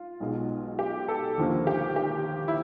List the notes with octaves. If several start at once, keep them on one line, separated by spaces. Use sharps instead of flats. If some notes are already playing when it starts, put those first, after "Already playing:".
Already playing: F4
B1 B2 G#3
G4
A4
D#2 D3 F3 A#3
G4
G4
E4